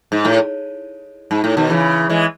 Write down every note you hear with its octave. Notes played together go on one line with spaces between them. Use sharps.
G#2
A2
G#2
A2
B2 D#3
C#3 E3
E3 G#3